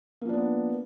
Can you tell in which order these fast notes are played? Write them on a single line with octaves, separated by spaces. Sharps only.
A#3 F3 D4 B3